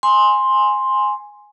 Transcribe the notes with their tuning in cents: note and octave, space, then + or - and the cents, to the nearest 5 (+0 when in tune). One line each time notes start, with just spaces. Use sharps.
G#5 +0 C6 +5